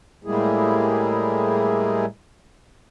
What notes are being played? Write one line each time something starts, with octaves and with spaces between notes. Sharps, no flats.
A2 G3 G#3 A#3 E4 G#4